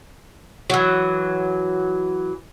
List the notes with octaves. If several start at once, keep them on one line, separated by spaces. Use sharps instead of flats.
E3 F#3